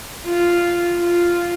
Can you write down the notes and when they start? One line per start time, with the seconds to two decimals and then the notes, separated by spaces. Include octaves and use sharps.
0.25 F4
1.00 F4